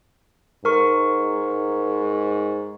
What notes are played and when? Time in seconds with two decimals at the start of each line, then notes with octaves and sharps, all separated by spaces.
0.65 G#2 A#4 C#6